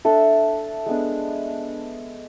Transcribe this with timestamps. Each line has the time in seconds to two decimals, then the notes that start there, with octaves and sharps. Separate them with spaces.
0.05 D4 A4 E5
0.86 G#3 B3 D4